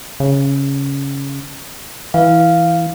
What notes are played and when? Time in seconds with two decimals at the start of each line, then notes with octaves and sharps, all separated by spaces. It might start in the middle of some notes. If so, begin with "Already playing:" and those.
0.20 C#3
2.14 E3 F5